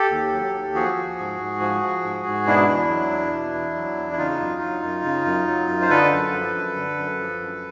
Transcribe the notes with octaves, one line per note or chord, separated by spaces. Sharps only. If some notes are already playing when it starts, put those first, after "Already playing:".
Already playing: G4 A4
D#2
F#3
D#2
F3 F#4 G#4
F3
G#2
G#2
F3
F3
G#2
G#2
B2 D4 E4
E2
F#3
E2
B2
E2
F#3
E2
E4
C#3 D#4 F4
F#2
F#3
F#2
C#3
F#2
F#3
F#2
C5
D3 A4 B4
F#2
F3
F#2
D3
F#2
F3
F#2